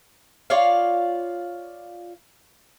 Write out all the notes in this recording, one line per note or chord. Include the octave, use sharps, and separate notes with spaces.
F4 C#5 D5 F5